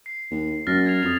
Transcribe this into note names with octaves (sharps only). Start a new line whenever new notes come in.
C7
D#2
F#2 F6 A6 A#6
G#6 C7 F7
F2 D#6 F7